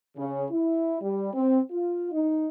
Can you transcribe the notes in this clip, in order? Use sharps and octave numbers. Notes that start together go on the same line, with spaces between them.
C#3
E4
G3
C4
F4
D#4